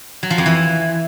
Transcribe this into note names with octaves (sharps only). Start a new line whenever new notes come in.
F#3
F3
F2
E3